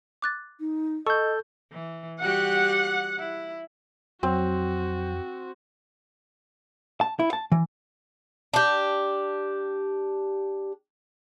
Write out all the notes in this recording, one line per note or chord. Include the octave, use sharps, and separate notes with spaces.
D6 F#6 A6
D#4
A4 D#5 C#6 G6
E3
G3 F#4 G4 F#5
E4
F2 F#3 C4 F#4
A5
E4
A5
E3
D4 G4